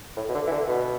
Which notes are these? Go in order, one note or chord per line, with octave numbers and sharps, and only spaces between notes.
A2
B2
D3
E3
D3
B2